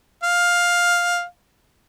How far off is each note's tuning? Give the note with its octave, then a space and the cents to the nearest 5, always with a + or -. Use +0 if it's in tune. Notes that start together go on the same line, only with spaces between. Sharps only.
F5 +10